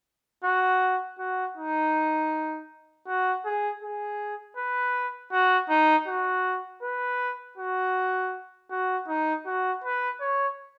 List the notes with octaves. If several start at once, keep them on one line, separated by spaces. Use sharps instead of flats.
F#4
F#4
D#4
F#4
G#4
G#4
B4
F#4
D#4
F#4
B4
F#4
F#4
D#4
F#4
B4
C#5